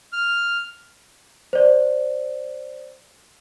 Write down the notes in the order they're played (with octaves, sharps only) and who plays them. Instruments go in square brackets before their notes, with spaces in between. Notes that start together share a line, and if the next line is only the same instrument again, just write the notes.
[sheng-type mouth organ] F6
[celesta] C5 D5